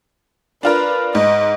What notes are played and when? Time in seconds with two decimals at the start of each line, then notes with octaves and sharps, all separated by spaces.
0.63 D4 F4 A#4 B4
1.15 G#2 D#5